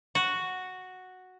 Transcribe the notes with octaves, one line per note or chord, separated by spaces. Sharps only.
F#4